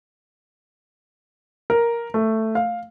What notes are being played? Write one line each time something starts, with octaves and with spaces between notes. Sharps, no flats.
A#4
A3
F5